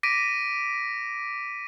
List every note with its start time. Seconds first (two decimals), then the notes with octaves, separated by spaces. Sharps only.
0.03 D6 A#6 B6 D7 D#7